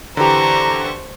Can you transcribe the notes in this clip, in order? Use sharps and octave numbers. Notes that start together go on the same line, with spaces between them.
D3 E3 G4 C5 A#5 C#6